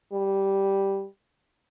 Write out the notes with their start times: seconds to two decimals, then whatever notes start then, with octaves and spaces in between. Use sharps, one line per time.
0.13 G3